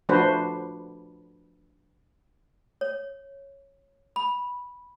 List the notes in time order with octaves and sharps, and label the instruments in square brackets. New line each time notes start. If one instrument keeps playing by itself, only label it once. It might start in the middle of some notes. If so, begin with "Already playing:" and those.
[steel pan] F3 A3 D4 F#4 B4 C5
[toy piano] C#5
B5